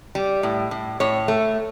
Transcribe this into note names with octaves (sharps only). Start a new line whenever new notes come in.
G3
A2
A2
A2 C#5
A3